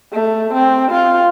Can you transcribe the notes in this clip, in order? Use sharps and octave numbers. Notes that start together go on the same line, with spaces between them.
A3
C4
F4